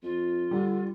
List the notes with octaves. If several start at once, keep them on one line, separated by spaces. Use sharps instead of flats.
F2 F4
D3 G3